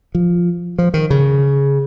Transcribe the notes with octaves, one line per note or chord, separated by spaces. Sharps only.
F3
F3
D#3
C#3